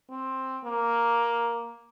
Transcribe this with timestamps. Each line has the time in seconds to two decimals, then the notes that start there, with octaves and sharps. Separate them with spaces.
0.10 C4
0.65 A#3